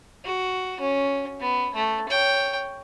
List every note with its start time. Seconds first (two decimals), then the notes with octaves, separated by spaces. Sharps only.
0.25 F#4
0.80 C#4
1.40 B3
1.74 A3
2.09 C#5 G5